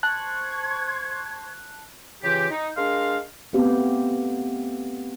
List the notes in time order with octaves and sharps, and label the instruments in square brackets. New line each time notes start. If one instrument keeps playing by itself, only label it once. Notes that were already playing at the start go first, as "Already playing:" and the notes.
[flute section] C5 C#6 G#6 [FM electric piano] A5 F#6
[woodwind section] C#3 E3 F4 G4
D#4
G#3 D4 A#4 F5 C6 F6
[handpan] A3 B3 C4 G4 F5